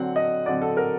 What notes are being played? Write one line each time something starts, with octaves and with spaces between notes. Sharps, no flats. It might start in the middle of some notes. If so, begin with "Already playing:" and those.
Already playing: D3 F#3 C4 F#5
D#5
D3 F#3 C4 D5
A4
A#4